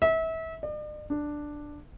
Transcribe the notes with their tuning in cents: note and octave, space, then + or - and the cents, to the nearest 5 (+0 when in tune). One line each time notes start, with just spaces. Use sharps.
E5 -30
D5 +45
D4 +5